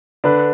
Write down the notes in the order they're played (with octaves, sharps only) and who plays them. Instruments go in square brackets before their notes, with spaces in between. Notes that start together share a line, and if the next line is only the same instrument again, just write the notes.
[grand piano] D3 D4 [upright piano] B4